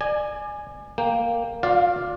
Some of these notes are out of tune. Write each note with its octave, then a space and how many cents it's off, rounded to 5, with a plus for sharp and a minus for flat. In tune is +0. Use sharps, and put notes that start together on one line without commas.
D5 +35 G#5 +0
A#3 +0 G5 +15
F4 +40 D5 +0 F5 +0